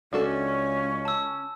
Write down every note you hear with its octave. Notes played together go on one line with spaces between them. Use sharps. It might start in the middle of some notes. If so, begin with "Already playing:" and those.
C#2 C#4 D4 F#4 A4
A5 E6